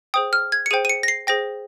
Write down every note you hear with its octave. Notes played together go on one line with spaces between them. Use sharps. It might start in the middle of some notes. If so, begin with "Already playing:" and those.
G#4 C5 G5 D#6
F6
G#6
C#7
G#4 C5 G5 D#7
D#7
C#7
A#6
C7
G#4 C5 G5 A#6